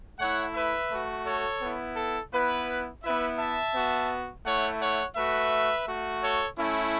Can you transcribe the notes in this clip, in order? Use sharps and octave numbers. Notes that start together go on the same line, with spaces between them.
A3 E4 C#5 F#5
B4 E5
A3 F#4
A4 C#5
B3 E4
A4
B3 E4 B4
B3 E4 B4 E5
E5 A5
B3 F#4
A3 E4 C#5 F#5
C#5 F#5
A3 F#4 B4 E5
A3 F#4
A4 C#5
A3 C#4 E4